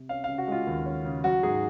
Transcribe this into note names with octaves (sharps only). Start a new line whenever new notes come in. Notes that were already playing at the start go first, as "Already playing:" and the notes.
Already playing: C3
C#4 F5
C#3 F5
F#4
G#3 F4
D#2
C#4
C#3
F#3 F#4
G#2 G#4